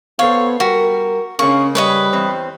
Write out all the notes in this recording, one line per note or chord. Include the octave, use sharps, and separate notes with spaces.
B3 A4 C5 C#5 F5
G3 F#4 A#4
C#3 G#3 A#3 C#4 C#6
G3 B4 C#5 D#5
E2 C4